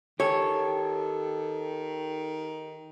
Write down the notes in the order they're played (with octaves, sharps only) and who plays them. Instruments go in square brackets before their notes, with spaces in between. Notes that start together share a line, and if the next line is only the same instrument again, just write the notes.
[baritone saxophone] D#3 [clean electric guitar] G4 A4 [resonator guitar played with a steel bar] C#5